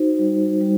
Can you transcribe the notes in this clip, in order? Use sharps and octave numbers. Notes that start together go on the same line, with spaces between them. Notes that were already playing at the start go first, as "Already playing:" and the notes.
Already playing: D#4 F#4 C5
G3
G3